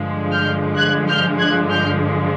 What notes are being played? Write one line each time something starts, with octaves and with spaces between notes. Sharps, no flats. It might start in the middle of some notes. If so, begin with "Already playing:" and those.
Already playing: G2 D3 F3 G#3
F6 G6
F#6 G#6
F6 G6
F#6 G#6
F6 G6